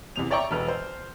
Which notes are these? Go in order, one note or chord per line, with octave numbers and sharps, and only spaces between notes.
E2 C3 F7
C#5 D5 E5 G5 A#5 C#6
E1 A4 B4 F6
C5